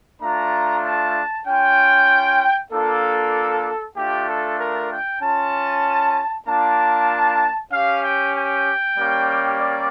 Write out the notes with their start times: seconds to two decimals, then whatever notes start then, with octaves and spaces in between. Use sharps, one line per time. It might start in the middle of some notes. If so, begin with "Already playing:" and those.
0.21 A3 D4 F4 A#5
0.85 A5
1.46 C#4 F4 G5
2.71 A#3 D4 F4 A4
3.96 A3 D4 F4 G4
4.29 A4
4.59 A#4
4.91 G5
5.22 C#4 F4 A5
6.47 A#3 D4 F4 A5
7.72 C#4 G4 F5
8.03 G5
8.35 G5
8.97 G3 A#3 C#4 G4
9.60 D5